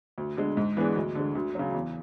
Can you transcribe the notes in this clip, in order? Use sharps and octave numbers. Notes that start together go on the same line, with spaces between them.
D2
D3 G#3
G#2
E3 B3 D4 G#4
D2
D3 G#3
D2
C#3 F#3
E2